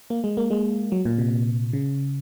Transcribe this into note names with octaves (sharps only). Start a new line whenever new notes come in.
A#3
G#3
A#3
G#3
F#3
A#2
C3
C#3